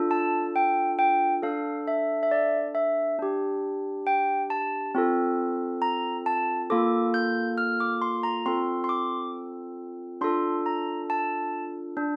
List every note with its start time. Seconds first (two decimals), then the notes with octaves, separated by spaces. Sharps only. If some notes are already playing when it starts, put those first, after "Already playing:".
Already playing: D4 F4 A4
0.11 A5
0.56 G5
0.99 G5
1.43 D4 A4 F5
1.88 E5
2.23 E5
2.31 D5
2.75 E5
3.19 D4 G4
4.07 G5
4.50 A5
4.95 C4 F4 A4
5.82 A#5
6.26 A5
6.70 A#3 F4 A4 D6
7.14 G6
7.58 F6
7.80 D6
8.02 C6
8.23 A#5
8.46 C4 F4 A4 C6
8.84 C6
8.89 D6
10.21 D4 F4 A4 C6
10.66 A#5
11.10 A5
11.97 D4